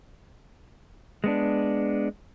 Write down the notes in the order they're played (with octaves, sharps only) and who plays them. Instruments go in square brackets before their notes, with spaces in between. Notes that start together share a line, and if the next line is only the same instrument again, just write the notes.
[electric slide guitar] G#3 B3 D4